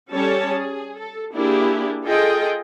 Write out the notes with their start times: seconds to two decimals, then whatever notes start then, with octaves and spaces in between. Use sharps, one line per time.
0.13 G3 C#4 A4 C#5 A5
0.48 G#4
0.99 A4
1.35 A#3 D4 E4 G4 G#4
2.05 F4 G#4 A4 D#5 G5